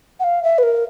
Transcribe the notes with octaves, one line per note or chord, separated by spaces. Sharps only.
F#5
F5
E5
B4
A#4